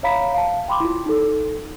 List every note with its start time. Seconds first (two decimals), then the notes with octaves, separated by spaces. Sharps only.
0.03 C#5 E5 F5 A#5 B5 B6
0.34 F5 A5
0.68 G5 B5 C6 D6
0.80 E4 F4
1.06 D#4 A4